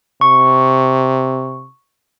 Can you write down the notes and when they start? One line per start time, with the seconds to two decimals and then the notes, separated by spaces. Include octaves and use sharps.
0.21 C3 C#6